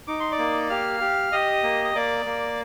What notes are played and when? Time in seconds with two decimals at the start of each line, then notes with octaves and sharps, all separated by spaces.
0.07 D#4 D6
0.20 C6
0.32 D5 D6
0.39 A#3
0.70 G4 F5 F6
1.01 G4
1.32 G4 D#5 D#6
1.63 A#3
1.85 D#6
1.95 A#3 D5 D6
2.26 A#3